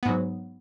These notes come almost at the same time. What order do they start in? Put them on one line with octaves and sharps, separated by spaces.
B3 G#2 F#3